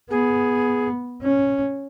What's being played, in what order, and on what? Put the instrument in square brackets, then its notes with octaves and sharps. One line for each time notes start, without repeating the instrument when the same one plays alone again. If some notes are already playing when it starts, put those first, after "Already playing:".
[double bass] B3 [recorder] G#4
[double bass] C#4